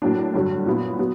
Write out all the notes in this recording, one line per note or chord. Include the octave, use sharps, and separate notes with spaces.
A2 F#3 A#3 D4
G2 D3 F#3
A#2 F#3 B3 E4
F#3 B3